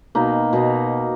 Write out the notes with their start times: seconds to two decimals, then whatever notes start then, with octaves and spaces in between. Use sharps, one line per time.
0.15 B2 A#3 D#4
0.53 B2 A#3 D#4